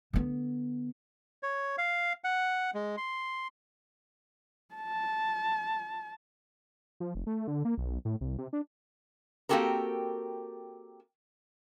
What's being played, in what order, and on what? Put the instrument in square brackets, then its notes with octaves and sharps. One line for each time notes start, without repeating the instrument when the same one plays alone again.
[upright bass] D3 B3
[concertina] C#5
F5
F#5
G#3
C6
[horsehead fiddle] A5
[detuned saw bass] F3
F1
A3
D3
A#3
B1
A2
C2
C3
D4
[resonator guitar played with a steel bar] A#3 C4 F#4 G4 A4 A#4